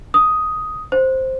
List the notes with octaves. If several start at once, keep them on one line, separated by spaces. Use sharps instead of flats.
D#6
C5